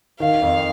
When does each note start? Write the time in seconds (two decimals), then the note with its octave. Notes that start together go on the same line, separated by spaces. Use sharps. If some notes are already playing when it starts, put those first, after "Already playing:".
0.20 D#3 F5
0.42 F2